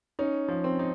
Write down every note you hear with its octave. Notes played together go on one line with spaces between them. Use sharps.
C#4 D#4
F3
C4
D#4